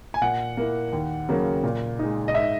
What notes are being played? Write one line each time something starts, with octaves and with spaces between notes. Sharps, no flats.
G#5
A#2 F#5
A#3 E4
D#2
C#3 F#3 A#3
A#2
G#3 D#4
D#5
G#2 E5